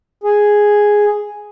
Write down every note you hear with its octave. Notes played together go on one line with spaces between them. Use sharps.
G#4